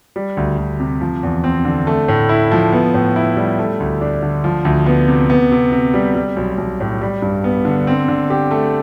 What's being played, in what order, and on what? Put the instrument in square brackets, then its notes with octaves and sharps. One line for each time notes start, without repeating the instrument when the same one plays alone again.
[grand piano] G3
D2
D2
C3
F3
E2
C4
D3
A3
A2
E4
F3
B3
A2
E4
G3
A3
D2
D4
D3
F3
D2
B3
C3
B3
C3
C3
G3
G3
B1
B1
A2
G3
G2
B3
D3
C4
D3
G4
A3